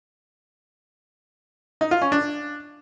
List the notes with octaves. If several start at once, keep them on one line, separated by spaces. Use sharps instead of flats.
D#4
F4
C#4
D4